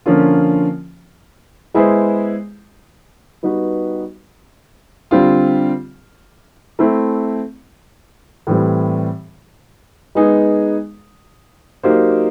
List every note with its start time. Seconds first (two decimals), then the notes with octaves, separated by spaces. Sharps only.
0.06 D3 F3 A#3 C#4 F4
1.74 G#3 B3 E4 G#4 C5
3.43 G3 B3 D#4 F#4 B4
5.11 D3 G3 C4 F4
6.79 A3 C4 E4
8.47 A2 E3 G3 C4
10.15 G#3 B3 D#4 G#4
11.83 F#3 A#3 D#4 G4 C5